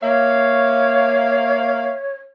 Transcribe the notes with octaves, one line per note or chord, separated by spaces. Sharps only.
A#3 C#5 E5 F5